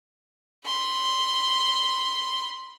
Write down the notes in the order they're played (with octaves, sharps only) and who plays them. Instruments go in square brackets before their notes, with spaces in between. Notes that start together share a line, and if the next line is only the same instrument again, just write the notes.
[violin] B5 C6